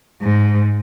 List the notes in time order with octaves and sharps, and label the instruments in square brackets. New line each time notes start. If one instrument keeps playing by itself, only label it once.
[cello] G#2